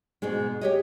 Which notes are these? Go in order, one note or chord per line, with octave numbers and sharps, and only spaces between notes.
G#2 B2 G#3
G4 C#5 D#5